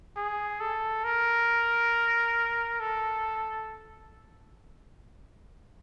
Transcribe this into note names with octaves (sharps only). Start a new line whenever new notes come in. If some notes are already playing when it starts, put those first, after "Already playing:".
G#4
A4
A#4
A4